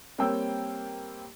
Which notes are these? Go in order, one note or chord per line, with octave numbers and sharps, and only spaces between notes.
G3 A#3 C4 C#5 G5 E6